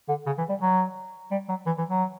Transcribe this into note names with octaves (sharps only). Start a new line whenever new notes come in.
D3
C#3
E3
G3
F#3
G3
F#3
E3
E3
F#3